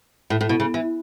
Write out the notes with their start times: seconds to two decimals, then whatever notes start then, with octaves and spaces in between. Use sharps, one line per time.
0.30 A2
0.41 A2
0.49 B2
0.60 C#3
0.74 E3